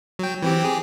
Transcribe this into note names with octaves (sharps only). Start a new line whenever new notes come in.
F#3 G5
E3 C4 G4
G4 G#4